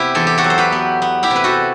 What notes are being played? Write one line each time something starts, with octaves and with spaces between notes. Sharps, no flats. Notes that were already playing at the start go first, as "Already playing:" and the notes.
Already playing: C3 B3 E4 G4
E2 A4
G4
F#4 A4
F#3
C5
G4 B4
B3
B3
E4 G4
C3
B4
F#4 A4